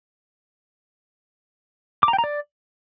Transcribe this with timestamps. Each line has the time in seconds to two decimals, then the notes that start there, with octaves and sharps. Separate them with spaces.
2.03 D6
2.08 A#5
2.13 G5
2.18 A#5
2.24 D5